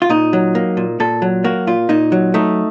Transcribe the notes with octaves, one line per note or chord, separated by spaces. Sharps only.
F4
A#2 D#4
F#3
A#3
A#2
A#2 A4
F#3
A#3 F#4
A#2 F4
A#2 D#4
F#3
A3 D#4